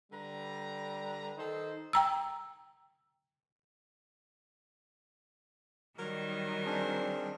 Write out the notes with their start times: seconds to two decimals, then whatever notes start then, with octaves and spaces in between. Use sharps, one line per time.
0.12 D3 G3 B4 A#5
1.38 D#3 D#4 A4 C5
1.93 G5 A#5 E6
5.99 D#3 F#3 G3 A#4
6.65 C4 D4 G#4